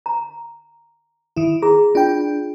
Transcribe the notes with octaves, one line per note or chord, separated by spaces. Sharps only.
A#5
D#3 E4
G#4 A#5
D4 F4 G5